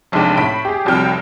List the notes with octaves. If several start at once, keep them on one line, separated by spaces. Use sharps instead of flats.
F1 B1 G#3 D4 G5
A2 B5 B6 D7
G4 G#4
F1 C2 F#3 G5 F6